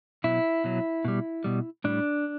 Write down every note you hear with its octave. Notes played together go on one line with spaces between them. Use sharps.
B2 F#3 E4
B2 F#3
B2 G3
B2 G3
A2 G3 D4